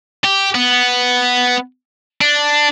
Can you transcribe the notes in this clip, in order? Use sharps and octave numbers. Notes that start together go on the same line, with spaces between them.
G4
B3
D4